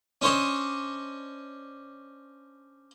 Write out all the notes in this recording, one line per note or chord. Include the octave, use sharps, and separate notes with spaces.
C#4 D4 C5 C#5 D#5